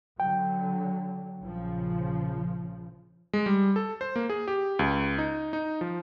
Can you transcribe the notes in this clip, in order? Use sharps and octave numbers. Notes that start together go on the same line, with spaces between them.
D3 F#3 G5
A#1 C#3 F3
G#3
G3
A4
C5
A#3
G#4
G4
C#2
D#4
D#4
F3